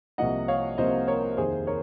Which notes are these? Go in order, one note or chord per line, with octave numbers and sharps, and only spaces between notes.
C2 C3 F3 A#3 D#5 F#5
C#5 F5
C2 C3 F3 A#3 C5 D#5
A#4 C#5
F1 D#2 D#3 G#4 C5
A#4 C#5